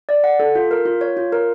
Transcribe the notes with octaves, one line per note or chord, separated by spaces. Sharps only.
D5
F#5
A4
F4
A#4
F4
C#5
F4
A#4